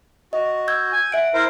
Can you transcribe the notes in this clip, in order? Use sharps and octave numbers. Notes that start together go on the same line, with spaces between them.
F#4 D#5
E6 G6 G#6
G#5
E5 F#5 D7
E4 A#4 C5